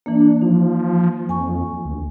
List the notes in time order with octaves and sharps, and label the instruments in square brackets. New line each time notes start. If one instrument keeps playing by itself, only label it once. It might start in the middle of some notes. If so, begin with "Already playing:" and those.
[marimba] E3 A#3 [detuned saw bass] D4
[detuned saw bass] F3 [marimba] D#4
[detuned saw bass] F2 [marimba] G#5 C#6
[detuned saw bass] D2